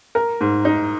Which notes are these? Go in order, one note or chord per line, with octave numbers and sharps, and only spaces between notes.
A#4
G#2
D#4